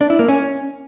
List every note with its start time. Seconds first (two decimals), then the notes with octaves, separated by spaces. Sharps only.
0.01 D4
0.10 E4
0.19 A#3
0.28 C#4